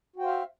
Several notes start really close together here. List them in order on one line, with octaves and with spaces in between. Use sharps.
F#4 G5 C5 F5 E5